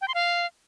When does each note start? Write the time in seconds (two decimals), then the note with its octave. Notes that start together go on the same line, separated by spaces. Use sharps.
0.01 G5
0.08 C6
0.14 F5